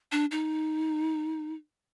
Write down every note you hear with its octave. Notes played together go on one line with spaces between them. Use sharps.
D4
D#4